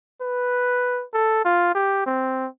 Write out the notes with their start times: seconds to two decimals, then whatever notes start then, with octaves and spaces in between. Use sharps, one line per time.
0.22 B4
1.14 A4
1.45 F4
1.75 G4
2.06 C4